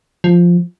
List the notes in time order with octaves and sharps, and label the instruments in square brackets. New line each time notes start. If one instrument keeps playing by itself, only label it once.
[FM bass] F3